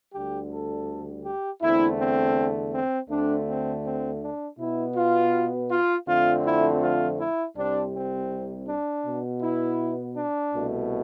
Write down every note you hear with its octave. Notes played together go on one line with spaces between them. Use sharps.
D2 D3 G3 G4
A4
G4
E2 D3 A3 C4 E4
C4
C4
D2 D3 A3 C4 D4
C4
C4
D4
B2 B3 E4
F4
F4
F2 D3 F3 A3 C4 F4
E4
F4
E4
C2 C3 G3 C4 D4
C4
D4
B2 B3
E4
D4
C2 B2 A3